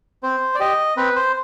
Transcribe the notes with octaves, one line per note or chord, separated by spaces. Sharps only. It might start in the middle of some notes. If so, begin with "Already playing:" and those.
C4 C5
D5
G4 D#5
C4 B4
C5